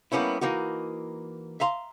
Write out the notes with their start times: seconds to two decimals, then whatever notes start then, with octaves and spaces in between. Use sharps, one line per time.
0.12 G3 A#3 B3 C#4 E4
0.41 E3 A#3 D#4 F#4
1.60 E5 F5 A#5 C6